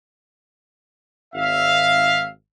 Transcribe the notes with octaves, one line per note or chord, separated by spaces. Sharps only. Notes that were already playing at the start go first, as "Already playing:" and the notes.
G#1 E5 F5